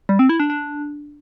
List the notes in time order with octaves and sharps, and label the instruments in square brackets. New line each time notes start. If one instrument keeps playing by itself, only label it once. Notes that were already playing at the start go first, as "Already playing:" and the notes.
[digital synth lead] G3
C4
E4
D4
D4